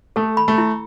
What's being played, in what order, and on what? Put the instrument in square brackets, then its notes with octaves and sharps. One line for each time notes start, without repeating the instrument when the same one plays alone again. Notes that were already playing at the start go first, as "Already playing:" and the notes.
[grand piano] A3 [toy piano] A4
[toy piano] B5
[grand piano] A3
[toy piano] E4